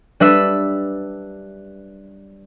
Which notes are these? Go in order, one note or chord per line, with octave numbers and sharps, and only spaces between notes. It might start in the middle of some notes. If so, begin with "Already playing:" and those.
G3 D4 B4 E5 E6 B6